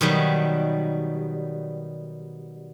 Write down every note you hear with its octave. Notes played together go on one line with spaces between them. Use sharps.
B2 D#3 F#3 G3